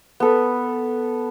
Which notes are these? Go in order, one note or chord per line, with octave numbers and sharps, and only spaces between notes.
B3 A4 B4